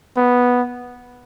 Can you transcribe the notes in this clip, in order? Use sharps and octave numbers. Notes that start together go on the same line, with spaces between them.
B3